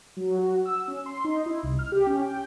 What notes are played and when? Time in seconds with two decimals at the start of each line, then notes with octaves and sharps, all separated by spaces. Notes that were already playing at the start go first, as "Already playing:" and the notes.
0.17 F#3
0.38 F#4
0.65 E6
0.88 C#4
1.06 C6
1.24 D#4
1.46 E4
1.63 C2
1.79 F6
1.92 G4
2.07 C#4
2.21 G5